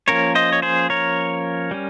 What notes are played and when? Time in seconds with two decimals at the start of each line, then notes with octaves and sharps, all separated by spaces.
0.08 F3 A#3 C#4 A#4 C#5
0.35 C5 D#5
0.53 C#5
0.62 G#4 C5
0.90 A#4 C#5
1.71 G3 C#4